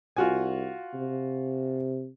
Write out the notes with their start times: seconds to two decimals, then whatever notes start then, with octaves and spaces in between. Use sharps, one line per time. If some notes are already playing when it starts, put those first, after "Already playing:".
0.17 C2 F4 F#4 G#5
0.94 C3